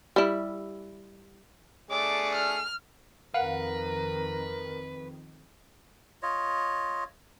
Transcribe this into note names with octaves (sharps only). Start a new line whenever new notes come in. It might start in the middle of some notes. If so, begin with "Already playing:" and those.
G3 E4
A3 D4 G#4 D6
F6
F2 D#3 A#4 B4 F5 F#5
F4 C#5 D#5